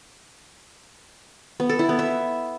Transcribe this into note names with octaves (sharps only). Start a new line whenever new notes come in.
B3
A4
E4
B3
E5